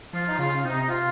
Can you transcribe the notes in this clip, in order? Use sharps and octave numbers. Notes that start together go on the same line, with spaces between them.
F3 F4
D#4
C#3 F4
C3 D#4
F4